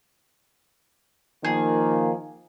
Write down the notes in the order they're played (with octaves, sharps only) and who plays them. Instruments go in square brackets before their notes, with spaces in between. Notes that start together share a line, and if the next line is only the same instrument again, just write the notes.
[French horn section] D#3 F3 A#3 [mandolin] G#4